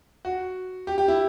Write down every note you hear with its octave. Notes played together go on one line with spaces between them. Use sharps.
F#4
G4
G4
E4